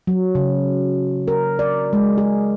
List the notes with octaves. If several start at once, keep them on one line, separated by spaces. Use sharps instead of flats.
F#3
C#3
A#4
D5
G#3
G#4